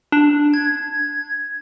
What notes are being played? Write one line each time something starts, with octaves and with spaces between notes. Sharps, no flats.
D4
G#6